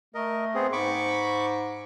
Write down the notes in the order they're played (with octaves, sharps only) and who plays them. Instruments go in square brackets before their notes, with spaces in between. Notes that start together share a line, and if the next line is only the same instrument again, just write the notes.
[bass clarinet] A3 [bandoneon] A#4 D#5
[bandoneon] B3 C4 G#4
[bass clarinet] G#2 [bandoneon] B5 C#6 D6